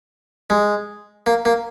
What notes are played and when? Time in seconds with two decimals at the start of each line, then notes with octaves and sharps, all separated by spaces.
0.50 G#3
1.26 A#3
1.45 A#3